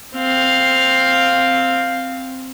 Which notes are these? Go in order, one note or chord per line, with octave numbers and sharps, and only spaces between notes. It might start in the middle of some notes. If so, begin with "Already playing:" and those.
C4 F5